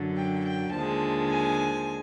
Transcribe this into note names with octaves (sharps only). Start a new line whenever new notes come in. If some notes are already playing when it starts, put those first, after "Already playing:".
Already playing: F#2 D3 F#3
G5
G5
D#2 D3 F3 G#3 A5
G#5